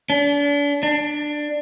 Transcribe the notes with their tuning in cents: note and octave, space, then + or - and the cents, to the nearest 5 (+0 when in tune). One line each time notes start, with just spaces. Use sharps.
D4 -35
D4 +15